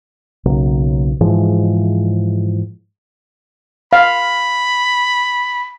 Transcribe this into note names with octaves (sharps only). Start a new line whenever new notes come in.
B1 C#3 F#3 A#3
G#2 E3 F3 G#3
F5 B5